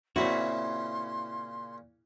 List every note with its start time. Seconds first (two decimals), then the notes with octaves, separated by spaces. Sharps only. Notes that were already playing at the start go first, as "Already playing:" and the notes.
0.16 A#2 C#3 C4 C#4 E4 F#4 C6